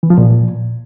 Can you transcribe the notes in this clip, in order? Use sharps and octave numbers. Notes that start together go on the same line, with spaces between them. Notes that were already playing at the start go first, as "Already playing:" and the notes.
E3
F3
A#2